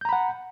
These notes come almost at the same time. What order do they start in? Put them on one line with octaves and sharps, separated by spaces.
G6 A#5 B5 F#5